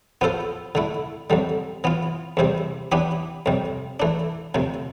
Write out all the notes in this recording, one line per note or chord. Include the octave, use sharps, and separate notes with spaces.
F3 B3 F4 A4 C5
D3 A3 E4
F2 D3 G3
E3 B3 F4
E2 C3 G3 C4
E3 B3 D4 G4 B4
F2 C3 G3
E3 A3 D4
D2 C3 F3